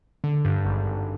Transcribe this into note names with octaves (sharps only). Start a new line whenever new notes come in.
D3
G2
G#1
G#1